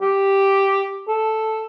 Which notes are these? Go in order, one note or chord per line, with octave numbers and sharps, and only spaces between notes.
G4
A4